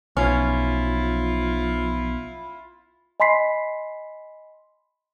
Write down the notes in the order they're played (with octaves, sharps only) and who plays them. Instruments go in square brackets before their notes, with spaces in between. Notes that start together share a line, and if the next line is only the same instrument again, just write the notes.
[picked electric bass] B1 [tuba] F3 [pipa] C#4 [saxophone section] E4 F4
[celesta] D#5 G#5 B5 C6 B6 C7